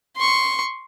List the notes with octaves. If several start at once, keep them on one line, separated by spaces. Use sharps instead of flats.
C6 C#6